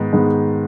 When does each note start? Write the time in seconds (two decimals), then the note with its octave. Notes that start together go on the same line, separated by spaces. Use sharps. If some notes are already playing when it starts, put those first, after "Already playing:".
Already playing: G#2 D#3 B3
0.13 G#2 D#3 B3